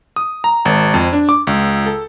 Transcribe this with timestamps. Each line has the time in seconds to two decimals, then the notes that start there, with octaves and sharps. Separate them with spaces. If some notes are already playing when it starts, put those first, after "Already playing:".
0.16 D#6
0.44 A#5
0.65 G#1
0.94 F2
1.13 D4
1.29 D6
1.47 C#2
1.86 A4